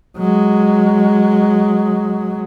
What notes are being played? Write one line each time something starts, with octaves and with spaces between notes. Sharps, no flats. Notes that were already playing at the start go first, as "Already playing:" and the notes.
F#3 G#3